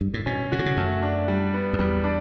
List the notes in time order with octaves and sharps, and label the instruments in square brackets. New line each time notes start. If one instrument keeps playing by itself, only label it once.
[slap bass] G2
A2
[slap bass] B2 [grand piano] C#4
[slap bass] C#3 [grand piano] F#4
[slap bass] D3
C#3
[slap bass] F#2 [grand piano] A3
[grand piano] D4
G3
B3
[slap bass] F#2
[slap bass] E2 [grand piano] G3
[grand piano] D4